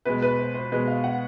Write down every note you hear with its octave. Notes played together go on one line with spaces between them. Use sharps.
B2 G#3 B4
B4
C5
C5
B2 G#3 B4
F5
F#5